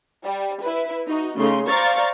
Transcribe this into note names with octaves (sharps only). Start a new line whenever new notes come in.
G3
E4 B4
D#4 F#4
C#3 A3 D#4 C6
C5 D5 F5 A#5 C#6 A6